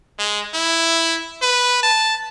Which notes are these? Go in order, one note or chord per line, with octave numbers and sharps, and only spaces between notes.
G#3
E4
B4
A5